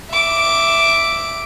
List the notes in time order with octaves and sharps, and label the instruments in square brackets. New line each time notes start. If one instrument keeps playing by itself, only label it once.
[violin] E5 D6